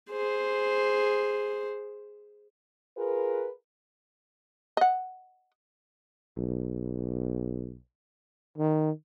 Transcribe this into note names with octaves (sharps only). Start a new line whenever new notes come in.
G#4 C5
F4 G#4 A#4 B4
D#5 F#5
B1
D#3